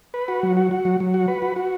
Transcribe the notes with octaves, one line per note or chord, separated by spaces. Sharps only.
B4
F#4
F#3
F#4
F#4
F#3
F#3
F#4
B4
F#4
F#4